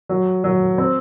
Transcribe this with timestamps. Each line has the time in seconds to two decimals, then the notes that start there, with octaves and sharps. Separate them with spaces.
0.09 F#3
0.44 F#3
0.78 C4